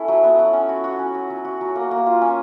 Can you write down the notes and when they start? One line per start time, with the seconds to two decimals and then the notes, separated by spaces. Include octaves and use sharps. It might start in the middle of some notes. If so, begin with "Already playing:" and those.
Already playing: C#4 E4 A4
0.08 F#3
0.23 B3
0.39 F#3
0.53 C#4
0.69 F#4
0.84 F#4
0.99 C#4
1.15 F#4
1.30 F#3
1.45 F#4
1.61 F#3
1.76 A#3
1.91 A#3
2.06 F4
2.21 C#4